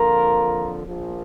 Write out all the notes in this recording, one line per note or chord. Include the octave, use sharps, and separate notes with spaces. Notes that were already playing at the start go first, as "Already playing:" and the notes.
Already playing: F2 D3 F3 A#3 F4 A#4
A#1 A#2 F3